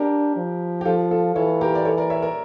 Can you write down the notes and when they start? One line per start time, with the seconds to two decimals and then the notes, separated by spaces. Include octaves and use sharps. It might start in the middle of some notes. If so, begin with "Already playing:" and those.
Already playing: D4 G4 A#4
0.36 F3
0.81 G4
0.85 F3 F4 A4
1.11 F4 A4
1.36 E3 A4 C#5
1.61 G4 A#4
1.75 D5
1.85 A4 C#5
1.98 A#4 D5
2.10 C#5 E5
2.22 A#4 D5